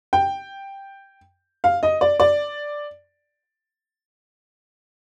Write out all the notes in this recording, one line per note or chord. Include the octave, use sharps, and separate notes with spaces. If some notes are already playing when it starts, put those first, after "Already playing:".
G5
F5
D#5
D5
D5